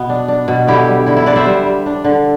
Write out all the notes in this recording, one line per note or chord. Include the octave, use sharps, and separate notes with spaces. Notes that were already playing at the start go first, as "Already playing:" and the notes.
Already playing: B2 B3
D4
D4
B2
D3 E4 G4
G3
D3 E4
E4
D3 B4 D5
C5 E5
G3
G3
D4
D3